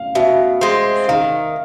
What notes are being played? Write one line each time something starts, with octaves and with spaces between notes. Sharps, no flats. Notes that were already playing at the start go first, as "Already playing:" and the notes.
Already playing: F5
B2 E5
G#3 C4
D#3 F5